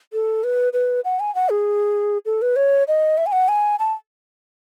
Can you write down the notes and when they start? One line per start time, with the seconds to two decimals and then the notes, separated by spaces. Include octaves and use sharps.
0.13 A4
0.44 B4
0.73 B4
1.05 F#5
1.20 G#5
1.35 F#5
1.49 G#4
2.26 A4
2.42 B4
2.56 C#5
2.88 D#5
3.18 E5
3.26 G#5
3.32 F#5
3.48 G#5
3.79 A5